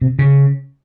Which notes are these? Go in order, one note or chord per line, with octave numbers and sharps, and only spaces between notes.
C3
C#3